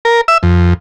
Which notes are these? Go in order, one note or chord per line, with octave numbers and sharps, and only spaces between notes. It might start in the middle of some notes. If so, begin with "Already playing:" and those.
A#4
E5 E6
F2